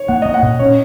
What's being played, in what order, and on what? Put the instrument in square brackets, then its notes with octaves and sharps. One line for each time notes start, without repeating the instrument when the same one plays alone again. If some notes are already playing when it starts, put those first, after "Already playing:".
Already playing: [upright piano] C#5
[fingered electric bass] A#3 [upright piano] F#5
[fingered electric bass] A#3 [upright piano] D#5
[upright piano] F#5
[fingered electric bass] A#2
[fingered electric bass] C#4 [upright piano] C#5